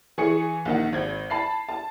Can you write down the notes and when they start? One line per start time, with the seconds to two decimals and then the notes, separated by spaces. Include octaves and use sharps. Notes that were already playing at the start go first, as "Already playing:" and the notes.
0.18 E3 G#4 G#5 C#6 C#7
0.65 A#1 D#3 F#5
0.93 G#1 G#6
1.30 A5 B5 C7
1.69 A5